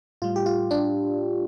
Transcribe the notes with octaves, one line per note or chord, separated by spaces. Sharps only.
A2 G3 F4
G4
F4
D4